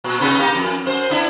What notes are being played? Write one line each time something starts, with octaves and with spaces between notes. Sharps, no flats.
A#2
C3 D#4 B4
A#3 D#4 G4
F2
F#2 C5
B3 D4 E4